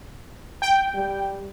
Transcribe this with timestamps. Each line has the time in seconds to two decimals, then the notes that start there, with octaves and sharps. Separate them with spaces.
0.62 G5
0.95 G3